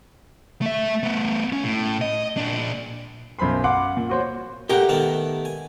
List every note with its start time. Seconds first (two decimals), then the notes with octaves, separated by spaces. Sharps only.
0.62 A3 E5
1.03 A3 B3
1.52 C#4
1.64 A2
2.01 D#5
2.37 A#2 D4
3.39 B1 F#2 C5 B5 C6
3.64 F5 F#5 C6 D6
3.97 A#2
4.10 F#4 C5 C#5
4.69 A2 G4 A#4 F#5 A#5
4.89 D#3 A3 B3
5.45 G#5